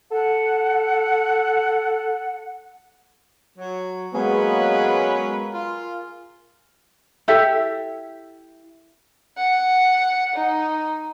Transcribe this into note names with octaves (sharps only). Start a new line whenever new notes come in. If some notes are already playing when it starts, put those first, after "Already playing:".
A4 F#5
F#3
F#3 G#3 A#3 B3 C#4 G#4 B4
F4
E4 G4 A4 E5
F#5
D#4